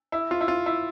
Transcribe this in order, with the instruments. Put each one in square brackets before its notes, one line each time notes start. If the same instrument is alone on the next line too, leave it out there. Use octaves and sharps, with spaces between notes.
[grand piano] E4
F4
E4
F4
E4